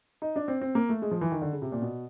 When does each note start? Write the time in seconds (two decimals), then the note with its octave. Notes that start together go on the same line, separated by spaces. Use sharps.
0.22 D#4
0.36 D4
0.48 C4
0.61 C4
0.75 A#3
0.89 A3
1.02 G#3
1.11 F3
1.21 E3
1.32 D#3
1.42 D3
1.52 C#3
1.62 C3
1.72 A#2
1.82 B2